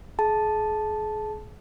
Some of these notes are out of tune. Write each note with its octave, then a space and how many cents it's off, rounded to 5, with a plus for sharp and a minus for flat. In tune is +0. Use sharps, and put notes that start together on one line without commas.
G#4 +35 A5 -5